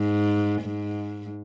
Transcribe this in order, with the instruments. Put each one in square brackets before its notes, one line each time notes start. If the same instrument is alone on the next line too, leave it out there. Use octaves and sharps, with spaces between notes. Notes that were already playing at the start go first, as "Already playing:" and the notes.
Already playing: [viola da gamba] G#2
G#2